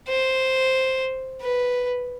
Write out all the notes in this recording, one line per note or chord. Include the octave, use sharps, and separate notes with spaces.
C5
B4